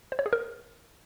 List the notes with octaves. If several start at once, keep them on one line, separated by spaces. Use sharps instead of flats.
C5
C#5
G#4
A#4